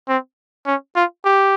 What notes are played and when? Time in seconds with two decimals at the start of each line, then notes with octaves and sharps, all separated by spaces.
0.09 C4
0.66 C#4
0.96 F4
1.25 G4